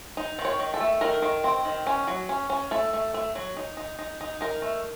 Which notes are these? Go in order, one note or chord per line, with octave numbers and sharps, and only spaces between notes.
D#4
D#3
C#5
D#3
A4
A3
D#3 A#4
D#3
C4
D#3
C#4
F#3
C#4
C#4
A3 A4
A3
A3
F#3
D#4
D#4
D#4
D#4
D#4 A#4
A3